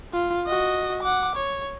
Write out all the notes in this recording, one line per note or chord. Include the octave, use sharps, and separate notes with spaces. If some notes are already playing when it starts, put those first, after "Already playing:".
F4
F#4 D#5
F#5 D6
C#5